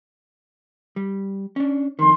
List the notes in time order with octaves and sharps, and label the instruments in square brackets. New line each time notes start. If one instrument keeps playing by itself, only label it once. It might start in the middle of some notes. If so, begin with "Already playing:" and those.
[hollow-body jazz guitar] G3
C#4 D4
[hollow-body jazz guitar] F2 D#3 [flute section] C6